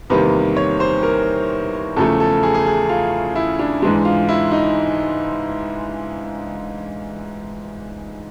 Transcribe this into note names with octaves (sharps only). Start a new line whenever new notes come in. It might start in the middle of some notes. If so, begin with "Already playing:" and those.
E2 C3 D#3 G3 A#3 B4
C#5
C5
A#4
E2 C#3 F3 A3 A4
A4
G#4
G#4
G#4
F4
E4
D4
G#2 E3 G#3 D4
F4
E4
D#4